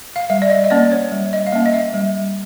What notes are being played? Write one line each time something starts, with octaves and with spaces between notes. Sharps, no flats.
F5
G3 E5
D5
D#5
D#5
A#3 C#4 D5
C#5
G3
D#5
F5
A#3 C#4 E5
D#5
E5
G3